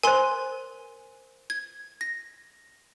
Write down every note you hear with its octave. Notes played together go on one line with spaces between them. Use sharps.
A#4 C5 G#5 C6
G#6
A#6